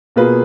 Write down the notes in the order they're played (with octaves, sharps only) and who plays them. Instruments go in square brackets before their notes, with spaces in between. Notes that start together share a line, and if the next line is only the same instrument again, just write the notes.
[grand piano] B2 A#3 F4 G#4 B4